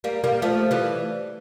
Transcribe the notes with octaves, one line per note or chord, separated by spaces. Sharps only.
G3 A#3
G3 A#3
F3 A3
E3 G3